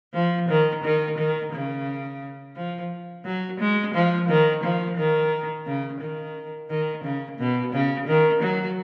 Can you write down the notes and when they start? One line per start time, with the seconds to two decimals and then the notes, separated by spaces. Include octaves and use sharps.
0.14 F3
0.48 D#3
0.84 D#3
1.18 D#3
1.52 C#3
2.56 F3
3.25 F#3
3.60 G#3
3.94 F3
4.29 D#3
4.63 F3
4.97 D#3
5.66 C#3
6.01 D#3
6.70 D#3
7.04 C#3
7.39 B2
7.73 C#3
8.07 D#3
8.42 F#3